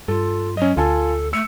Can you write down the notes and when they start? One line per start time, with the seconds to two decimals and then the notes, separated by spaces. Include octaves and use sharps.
0.08 G2 F4 A4
0.57 F#3 C#4 D#5
0.77 D2 F4 A4 G#5 A5
1.33 A3 E6 C#7